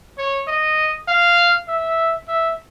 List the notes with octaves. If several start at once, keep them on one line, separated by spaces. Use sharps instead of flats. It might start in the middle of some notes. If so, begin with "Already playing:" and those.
C#5
D#5
F5
E5
E5